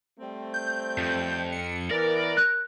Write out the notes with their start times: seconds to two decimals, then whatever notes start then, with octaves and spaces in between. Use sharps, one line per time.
0.19 G3 A3 C4
0.54 G6
0.98 F2
1.52 C#7
1.91 E3 B3 A#4 D5
2.37 F#6